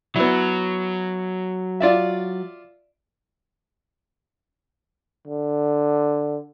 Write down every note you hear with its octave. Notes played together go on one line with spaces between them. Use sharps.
F#3 B3 E4
F4 D5 E5
D3